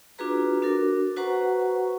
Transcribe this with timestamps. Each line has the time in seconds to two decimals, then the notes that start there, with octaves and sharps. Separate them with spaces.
0.18 D4 F4 F#4 G#4 B4 A#5
0.62 D4 F#4 A4 A#4
1.17 F#4 B4 C5 F#5 A#5 C#6